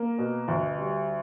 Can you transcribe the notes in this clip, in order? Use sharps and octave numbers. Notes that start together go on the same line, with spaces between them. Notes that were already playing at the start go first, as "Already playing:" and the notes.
Already playing: A#3
B2
D2
G3